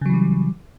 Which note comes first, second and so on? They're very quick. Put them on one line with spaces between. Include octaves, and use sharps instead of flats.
C#3 F#3 E3 G3